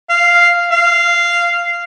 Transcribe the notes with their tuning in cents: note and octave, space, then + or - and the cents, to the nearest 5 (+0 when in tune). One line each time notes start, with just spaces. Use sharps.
F5 -5
F5 -10